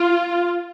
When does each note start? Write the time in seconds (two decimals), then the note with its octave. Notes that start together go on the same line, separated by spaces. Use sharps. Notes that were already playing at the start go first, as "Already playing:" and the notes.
Already playing: F4